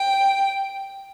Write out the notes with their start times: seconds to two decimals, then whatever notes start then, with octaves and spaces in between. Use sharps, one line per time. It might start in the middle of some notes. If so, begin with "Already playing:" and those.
Already playing: G5